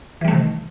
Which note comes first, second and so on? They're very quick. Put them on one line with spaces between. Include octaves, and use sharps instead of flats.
E3 G3 A3 C3 D#3